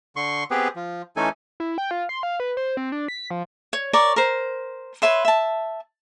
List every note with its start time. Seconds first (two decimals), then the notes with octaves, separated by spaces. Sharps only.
0.16 D3 C6 C#6
0.51 B3 C4 G4 G#4 B4
0.76 F3
1.16 E3 A3 C#4 D#4 A4 G#5
1.60 E4
1.78 G5
1.91 F4
2.09 C6
2.23 F5
2.40 B4
2.57 C5
2.77 C4
2.92 D4
3.08 B6
3.30 F3
3.73 C#5
3.93 A#4 C#5 D5 C#6
4.16 A#4 C5
5.02 B4 C#5 E5 C6
5.25 E5 A5